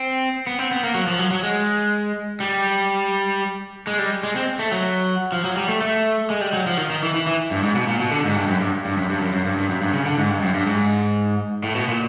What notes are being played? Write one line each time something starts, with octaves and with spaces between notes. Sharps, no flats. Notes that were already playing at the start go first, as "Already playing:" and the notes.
Already playing: C4
B3
C4
B3
A#3
F#3
F3
F#3
F#3
G#3
G3
G#3
G3
G#3
C4
A3
F#3
F3
F#3
G3
A3
A3
G#3
G3
F#3
F3
D#3
D#3
E3
E3
E3
G2
G#2
B2
A#2
B2
D3
G#2
G2
F#2
G2
G2
F#2
G2
F#2
F#2
G2
G2
F#2
G2
C#3
D3
G#2
G2
F#2
G2
G#2
A2
B2
A#2